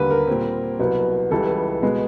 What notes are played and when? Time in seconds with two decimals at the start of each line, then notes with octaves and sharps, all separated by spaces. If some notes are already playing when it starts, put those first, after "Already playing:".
Already playing: D#2 D3 G3 A#3 B4
0.11 A#4
0.27 A#2 G3 C4
0.79 C2 B2 F#3 B3
1.30 C#2 C#3 E3 G3 A4
1.82 B2 G#3 B3